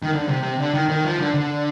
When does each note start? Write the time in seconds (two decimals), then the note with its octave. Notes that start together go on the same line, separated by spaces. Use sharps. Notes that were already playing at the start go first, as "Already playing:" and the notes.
0.03 D#3
0.13 D3
0.28 C3
0.43 C3
0.59 D3
0.74 D#3
0.89 D#3
1.04 F3
1.19 D3
1.34 D3